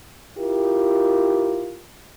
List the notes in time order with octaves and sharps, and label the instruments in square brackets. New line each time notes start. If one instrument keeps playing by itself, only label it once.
[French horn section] E4 F4 G4 A#4